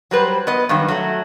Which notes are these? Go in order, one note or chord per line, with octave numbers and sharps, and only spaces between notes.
F#3 G3 B4 C5
B3 B4 D#5
G2 D#3 F#3
F#3 A3